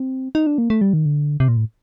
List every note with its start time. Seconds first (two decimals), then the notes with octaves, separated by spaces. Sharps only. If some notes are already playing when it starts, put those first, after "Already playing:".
Already playing: C4
0.35 D#4
0.47 D4
0.58 A#3
0.70 A3
0.81 G3
0.93 D#3
1.06 D3
1.40 C3
1.48 A#2
1.57 A2